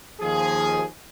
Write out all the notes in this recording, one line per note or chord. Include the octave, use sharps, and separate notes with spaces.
D#2 F3 G#4